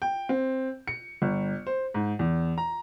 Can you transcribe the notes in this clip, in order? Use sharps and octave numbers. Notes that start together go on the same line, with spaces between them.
G5
C4
C#7
G1
C5
G#2
E2
A#5